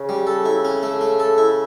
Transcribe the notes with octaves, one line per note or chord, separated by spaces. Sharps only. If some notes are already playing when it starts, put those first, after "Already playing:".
Already playing: C#3
G3
A4
E4
C#4
A3
A3
A4
E4